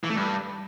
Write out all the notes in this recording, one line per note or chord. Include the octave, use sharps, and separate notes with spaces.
E3
A3
G2